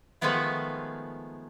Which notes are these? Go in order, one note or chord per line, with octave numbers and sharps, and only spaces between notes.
D#3 F3 G#3 A3 B3 F4